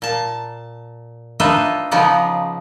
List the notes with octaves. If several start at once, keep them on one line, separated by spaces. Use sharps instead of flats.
A#2 A5
D4 D#4 F4 B4 D#5 E5
C#3 F3 B3 D#4 D5